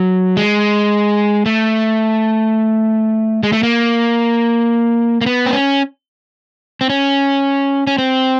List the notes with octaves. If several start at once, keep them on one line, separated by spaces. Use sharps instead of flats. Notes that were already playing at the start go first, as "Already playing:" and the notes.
Already playing: F#3
G#3
A3
G#3
A3
A#3
A#3
B3
C4
C#4
C4
C#4
C#4
C4